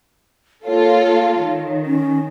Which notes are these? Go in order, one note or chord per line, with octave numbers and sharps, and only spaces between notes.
A#3 F4 A4 C#5
D#3
C#4